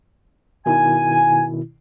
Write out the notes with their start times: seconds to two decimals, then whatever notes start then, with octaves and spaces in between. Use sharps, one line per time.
0.66 B2 D#3 E4 G#5